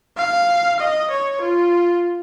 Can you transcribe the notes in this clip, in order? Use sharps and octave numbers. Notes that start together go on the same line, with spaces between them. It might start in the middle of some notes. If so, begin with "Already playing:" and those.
F5
D#5
C#5
F4